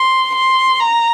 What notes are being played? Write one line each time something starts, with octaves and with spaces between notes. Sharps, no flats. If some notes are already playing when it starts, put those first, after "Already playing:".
Already playing: C6
C6
A#5